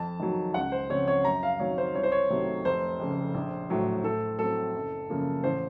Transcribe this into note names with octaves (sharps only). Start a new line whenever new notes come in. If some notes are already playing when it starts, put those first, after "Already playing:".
Already playing: F2 A5
D#3 F#3
C#2 F#5
C5
C#3 F3 C4 C#5
C#5
F#2 A#5
F5
D#3 F#3 C4 C#5
C5
C2 C#5
C5
C#5
C3 D#3 F#3 A3
F1 C5
F2 C#3
A#1
A2 F#3
A2 A4
F#3 C4 A4
F#1
F#2 C#3 F3 A#3
A1 C5